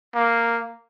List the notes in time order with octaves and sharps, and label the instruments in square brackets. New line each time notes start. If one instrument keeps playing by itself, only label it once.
[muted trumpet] A#3